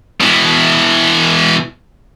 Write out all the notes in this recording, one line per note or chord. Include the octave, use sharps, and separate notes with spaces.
B2 E3